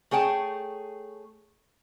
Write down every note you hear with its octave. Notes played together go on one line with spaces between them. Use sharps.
A3 G#4 C#5 G5 A5